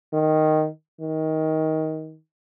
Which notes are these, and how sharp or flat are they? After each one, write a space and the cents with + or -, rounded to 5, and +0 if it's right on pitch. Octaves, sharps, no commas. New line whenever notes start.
D#3 -5
D#3 +20